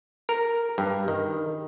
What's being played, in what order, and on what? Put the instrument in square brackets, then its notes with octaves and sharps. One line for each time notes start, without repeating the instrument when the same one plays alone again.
[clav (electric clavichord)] A#4
G2
D#3